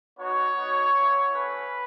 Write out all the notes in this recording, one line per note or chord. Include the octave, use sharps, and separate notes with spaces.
B3 D#4 F#4 C#5
B3 D#4 F#4
B3 E4
A3 C#4 F#4 B4